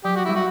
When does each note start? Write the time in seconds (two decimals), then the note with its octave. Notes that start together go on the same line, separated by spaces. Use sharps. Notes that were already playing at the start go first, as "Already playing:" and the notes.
0.05 F#3 G4
0.16 F#4
0.25 G3 E4
0.36 F#4